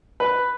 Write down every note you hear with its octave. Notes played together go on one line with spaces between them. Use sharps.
B4